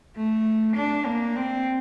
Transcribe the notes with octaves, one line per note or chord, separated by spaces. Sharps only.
A3
D4
A#3
C4